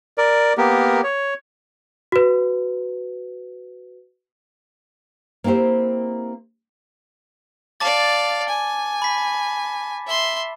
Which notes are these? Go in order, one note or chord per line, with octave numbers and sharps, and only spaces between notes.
A#4 D5
A#3 B3 G4 A#4
C#5
F#4 B4
A#3 C4 E4 G4 C5
D5 F5 A5 D6 A6
G#5
B5 B6
E5 C6